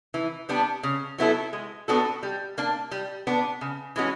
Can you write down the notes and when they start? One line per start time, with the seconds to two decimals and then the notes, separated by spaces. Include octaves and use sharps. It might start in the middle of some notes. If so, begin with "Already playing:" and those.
0.14 E3
0.49 G3 B3 D4
0.83 C#3
1.18 F#3 B3 E4 A4
1.53 G#3
1.88 B3 D4 F#4 A4
2.23 G3
2.58 A#3 D4
2.91 G3
3.27 B3 D4
3.61 C#3
3.96 E3 G#3 C#4 F#4